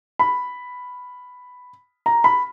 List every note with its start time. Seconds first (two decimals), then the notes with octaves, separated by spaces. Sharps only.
0.19 B5
2.06 A#5
2.24 B5